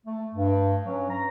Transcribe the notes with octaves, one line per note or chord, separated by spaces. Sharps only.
A3
G2
F#3 C#4
A#5